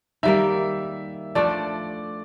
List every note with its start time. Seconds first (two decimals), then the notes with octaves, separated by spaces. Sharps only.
0.23 D#3 G3 A#3 E5
1.35 F3 A3 D4 D5